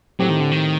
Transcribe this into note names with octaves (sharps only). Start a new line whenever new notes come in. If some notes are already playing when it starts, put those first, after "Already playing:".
A2 F#3 A3 C4 G4
D#3
D3
D#3